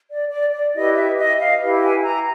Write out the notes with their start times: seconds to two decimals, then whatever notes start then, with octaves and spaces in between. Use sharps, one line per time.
0.10 D5
0.31 D5
0.53 D5
0.75 E4 G4 B4 D#5
0.96 E5
1.18 D#5
1.39 F5
1.61 E4 G4 B4
1.82 G#5
2.04 A#5